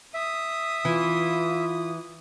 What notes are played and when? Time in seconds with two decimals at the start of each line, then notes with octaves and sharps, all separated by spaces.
0.14 E5 D#6
0.85 E3 F4